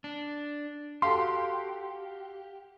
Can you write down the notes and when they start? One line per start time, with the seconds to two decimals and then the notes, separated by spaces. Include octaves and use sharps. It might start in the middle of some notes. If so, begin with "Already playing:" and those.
0.04 D4
1.02 F#4 G4 A4 F5 C6